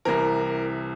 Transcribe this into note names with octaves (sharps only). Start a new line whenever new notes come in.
C2 C3 E3 A#4